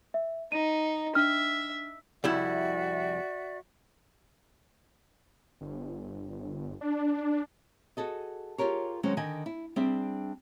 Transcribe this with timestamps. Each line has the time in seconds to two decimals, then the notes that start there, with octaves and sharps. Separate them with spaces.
0.14 E5
0.52 D#4 D#7
1.15 D4 E5 F6
2.24 C2 F2 E4 F#4 D5 E5
5.61 G1
6.81 D4
7.97 F#4 G#4 A4 D#5
8.58 F4 G4 G#4 A#4 C#5
9.03 D#3 F#3 G#3 C#4 C5
9.17 D3 D#3 D#5 G#5
9.46 E4
9.76 G3 C4 D4 G#4 E5